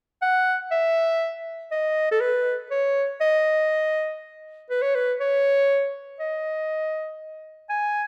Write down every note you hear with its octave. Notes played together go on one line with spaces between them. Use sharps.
F#5
E5
D#5
A4
B4
C#5
D#5
B4
C#5
B4
C#5
D#5
G#5